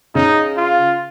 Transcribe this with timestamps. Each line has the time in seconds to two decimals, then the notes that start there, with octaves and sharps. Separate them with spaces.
0.15 C#3 D#4
0.57 F4